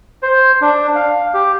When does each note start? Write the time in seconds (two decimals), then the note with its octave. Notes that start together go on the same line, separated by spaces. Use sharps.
0.23 C5
0.61 D4
0.95 F5
1.34 G4